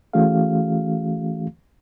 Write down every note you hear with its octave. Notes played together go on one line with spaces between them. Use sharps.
E3 A3 C#4 F#4 G#4 F5